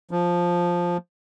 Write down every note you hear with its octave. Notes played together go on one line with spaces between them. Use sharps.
F3